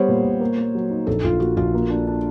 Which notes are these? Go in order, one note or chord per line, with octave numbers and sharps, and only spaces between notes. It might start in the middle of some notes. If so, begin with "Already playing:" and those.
Already playing: G3 B3 C5 C#5
A#2
A#2
A#3
A#3
F#3
D#4
A#1 A4
A#1 F4
A#2 F#4
A#1 F4
A#3
D4
D4